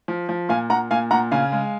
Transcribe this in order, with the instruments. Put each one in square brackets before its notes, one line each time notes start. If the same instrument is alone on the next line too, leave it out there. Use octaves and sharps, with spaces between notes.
[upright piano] F3
F3
A#2 F5 G#5
A#2 F#5 A#5
A#2 F5 G#5
A#2 F#5 A#5
C#3 F5 G#5
G#3